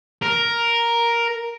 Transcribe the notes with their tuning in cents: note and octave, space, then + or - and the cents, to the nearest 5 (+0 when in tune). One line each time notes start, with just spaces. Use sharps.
A#4 +5